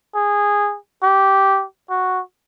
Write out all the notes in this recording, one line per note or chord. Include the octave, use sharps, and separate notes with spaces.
G#4
G4
F#4